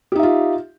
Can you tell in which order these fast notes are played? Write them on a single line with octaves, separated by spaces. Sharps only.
G4 D#4 E5 F4